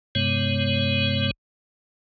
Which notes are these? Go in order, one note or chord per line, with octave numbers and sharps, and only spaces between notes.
G2 C3 G#3 B3 C#5